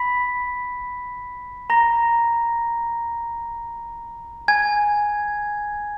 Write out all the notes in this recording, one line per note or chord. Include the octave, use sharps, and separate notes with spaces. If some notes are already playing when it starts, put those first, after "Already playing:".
Already playing: B5 B6
A#5 A#6
G#5 G#6